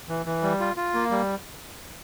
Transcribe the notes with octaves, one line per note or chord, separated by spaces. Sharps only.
E3
E3
G3
F4
F4
A#3
G3